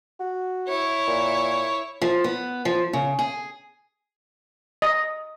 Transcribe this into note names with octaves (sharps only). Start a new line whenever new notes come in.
F#4
E4 C#5
A#2
F3
B3
F3
C#3
G#4
D#5